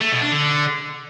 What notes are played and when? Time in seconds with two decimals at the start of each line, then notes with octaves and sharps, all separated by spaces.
0.01 A3
0.12 B2
0.22 D4
0.32 D3